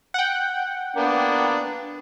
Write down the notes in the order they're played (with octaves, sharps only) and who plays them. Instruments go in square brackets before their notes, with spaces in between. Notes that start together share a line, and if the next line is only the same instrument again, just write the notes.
[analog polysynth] F#5 G5
[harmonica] A#3 B3 D4